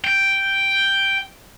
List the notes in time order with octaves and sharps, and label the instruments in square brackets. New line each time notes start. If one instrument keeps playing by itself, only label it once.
[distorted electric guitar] G5